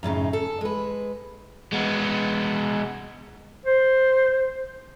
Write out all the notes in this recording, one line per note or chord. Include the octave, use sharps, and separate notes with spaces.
F#2 A2 C#3 D#4
A4
G#3 B4
G#3 B3
C5